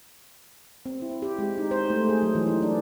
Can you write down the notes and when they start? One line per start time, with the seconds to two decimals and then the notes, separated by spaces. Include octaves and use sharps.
0.86 C4
1.02 E4
1.22 G4
1.39 G#3
1.58 D#4
1.71 C5
1.90 A3
2.09 G#4
2.22 F#3
2.35 E3
2.47 D#4
2.62 D4